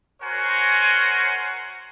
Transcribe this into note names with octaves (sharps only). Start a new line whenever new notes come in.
F#4 A#4 C5 C#5 F#5 G#5